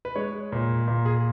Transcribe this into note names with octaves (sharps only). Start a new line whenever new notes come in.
B4
G#3 C#5
A#2
A#2
G#4